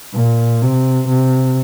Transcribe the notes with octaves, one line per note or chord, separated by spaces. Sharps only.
A#2
C3
C3